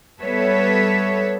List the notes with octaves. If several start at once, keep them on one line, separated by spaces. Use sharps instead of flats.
G3 B3 A4 B4 C#5 E5